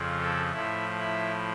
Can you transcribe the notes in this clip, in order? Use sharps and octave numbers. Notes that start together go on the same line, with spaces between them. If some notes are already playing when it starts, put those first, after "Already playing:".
Already playing: F2 C#3 F3
A4
A2 F3 E4
E4